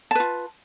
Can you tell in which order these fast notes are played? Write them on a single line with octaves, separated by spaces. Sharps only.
A5 B4 F4